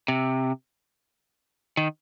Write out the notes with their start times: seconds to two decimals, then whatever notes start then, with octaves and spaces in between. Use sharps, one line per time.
0.08 C3
1.77 D#3